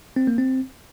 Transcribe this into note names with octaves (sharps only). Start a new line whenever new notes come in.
C4
A#3
C4